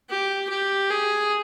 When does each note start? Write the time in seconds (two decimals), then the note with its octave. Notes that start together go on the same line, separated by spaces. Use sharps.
0.09 G4
0.50 G4
0.90 G#4